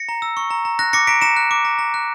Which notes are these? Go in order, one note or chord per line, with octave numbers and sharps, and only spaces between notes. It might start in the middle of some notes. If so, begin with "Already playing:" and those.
Already playing: A#6 C#7
A#5
E6
C#6
A#5
A#5
F#6 A#6
D6 A#6 C#7
A#5 B6 D7
A#5 C#7 E7
F#6
D6
A#5
A#5
F#6